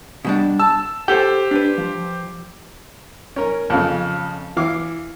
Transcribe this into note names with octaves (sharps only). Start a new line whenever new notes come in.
B2 G3 D4
A5 E6
G4 A4 C5 G5
D4 B4
F3
C#4 A#4
F2 C#3
E3 F5 D6